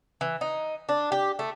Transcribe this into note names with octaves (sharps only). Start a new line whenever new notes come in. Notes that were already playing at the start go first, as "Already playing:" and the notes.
E3
D#4
D4
G4
A3